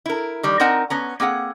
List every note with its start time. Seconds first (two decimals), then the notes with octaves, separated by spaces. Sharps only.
0.06 E4 A#4
0.43 D#3 G3
0.60 C4 D#4 A#4 F#5 G#5 A#5
0.90 B3 C#4 A#5
1.20 A#3 C4 G#4 F#5